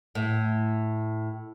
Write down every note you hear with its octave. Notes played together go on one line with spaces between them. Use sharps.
A2